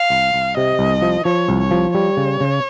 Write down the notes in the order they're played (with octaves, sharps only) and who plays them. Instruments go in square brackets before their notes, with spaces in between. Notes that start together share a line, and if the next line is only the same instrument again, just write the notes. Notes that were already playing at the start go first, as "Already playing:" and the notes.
Already playing: [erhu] F5
[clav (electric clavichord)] C2
C2
[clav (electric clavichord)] C3 [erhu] D#5
[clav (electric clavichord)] C2
F3
[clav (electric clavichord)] F3 [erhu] C#5
[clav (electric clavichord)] C2
[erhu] C#5
[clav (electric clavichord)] F3
[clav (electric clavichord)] G3 [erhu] C#5
[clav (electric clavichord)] C#3
C#3